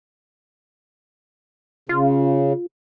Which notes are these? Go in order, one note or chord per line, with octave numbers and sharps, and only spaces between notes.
C#3 F4